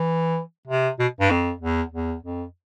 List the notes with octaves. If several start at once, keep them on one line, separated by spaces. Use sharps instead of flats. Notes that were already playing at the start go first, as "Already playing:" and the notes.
Already playing: E3
C3
B2
G2
F2
E2
E2
F2